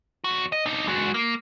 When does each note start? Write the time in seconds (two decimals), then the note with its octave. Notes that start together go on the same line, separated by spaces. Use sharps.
0.24 E2 F#4
0.52 D#5
0.66 D4 D#4
0.88 G#3 F#4
1.14 A#3